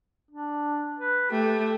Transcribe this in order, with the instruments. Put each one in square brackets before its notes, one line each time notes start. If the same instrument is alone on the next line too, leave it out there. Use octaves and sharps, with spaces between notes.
[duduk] D4
B4
[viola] A3 [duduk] G4